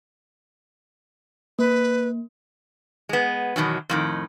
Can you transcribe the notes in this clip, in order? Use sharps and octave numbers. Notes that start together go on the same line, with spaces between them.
A#3 B4
G#3 B3
E2 B2 D#3 F#3
F2 A2 D#3